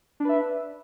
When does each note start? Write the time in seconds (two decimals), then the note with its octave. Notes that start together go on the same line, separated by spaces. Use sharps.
0.20 D4
0.25 B4
0.29 E5